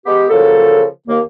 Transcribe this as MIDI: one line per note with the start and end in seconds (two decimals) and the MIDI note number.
0.06 0.25 56
0.06 0.25 59
0.06 0.25 67
0.30 0.85 49
0.30 0.85 53
0.30 0.85 54
0.30 0.85 58
0.30 0.85 69
1.07 1.20 39
1.07 1.20 58